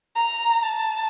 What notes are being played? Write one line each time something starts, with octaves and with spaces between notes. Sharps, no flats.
A#5
A5